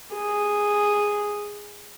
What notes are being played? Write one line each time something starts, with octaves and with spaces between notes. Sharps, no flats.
G#4